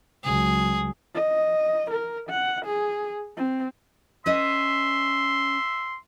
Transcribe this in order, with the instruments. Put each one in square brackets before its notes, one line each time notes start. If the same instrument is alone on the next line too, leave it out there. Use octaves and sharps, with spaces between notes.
[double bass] C#2 F#3 [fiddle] G#4
[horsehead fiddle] D#5
A#4
F#5
G#4
C4
[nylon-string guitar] C#4 B4 D#5 [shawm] E5 [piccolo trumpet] C6